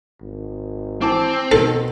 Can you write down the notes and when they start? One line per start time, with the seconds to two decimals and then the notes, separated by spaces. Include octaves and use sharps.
0.22 G#1
1.01 E3 C4 A5 D6
1.52 B2 D#3 A4